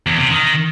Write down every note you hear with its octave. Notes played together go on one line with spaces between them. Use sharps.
E2
C3
D#3